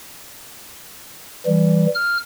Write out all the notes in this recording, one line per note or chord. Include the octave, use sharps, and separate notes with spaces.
E3 G3
F6